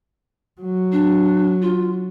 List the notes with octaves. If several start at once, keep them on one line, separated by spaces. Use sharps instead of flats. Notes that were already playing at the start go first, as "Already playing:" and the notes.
F#3
D4
F4